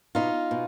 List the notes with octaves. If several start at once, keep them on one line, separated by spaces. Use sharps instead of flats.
B2 D#4 F4
B2